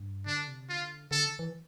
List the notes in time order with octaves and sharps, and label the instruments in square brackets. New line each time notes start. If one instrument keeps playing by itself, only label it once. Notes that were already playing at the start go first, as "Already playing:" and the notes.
Already playing: [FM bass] G2
[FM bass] D3 [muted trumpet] D4
[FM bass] C3
[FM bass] D3 [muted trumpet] F4
[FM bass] D3 [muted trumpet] A4
[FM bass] E3